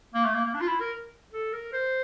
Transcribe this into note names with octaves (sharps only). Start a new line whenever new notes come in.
A#3
A3
A#3
A#3
D4
F4
E4
A#4
A4
A#4
C5